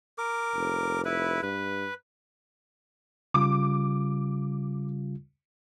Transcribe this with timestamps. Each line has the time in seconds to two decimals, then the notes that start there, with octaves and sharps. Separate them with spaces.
0.18 A#4 D6
0.55 F1
1.05 E4 B4
1.42 G2 B4
3.34 C#3 G3 F4 D6